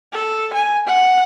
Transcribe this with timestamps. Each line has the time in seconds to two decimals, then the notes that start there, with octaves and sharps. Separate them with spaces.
0.13 A4
0.53 G#5
0.87 F#5